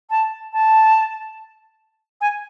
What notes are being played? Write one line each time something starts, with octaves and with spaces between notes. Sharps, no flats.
A5
A5
G#5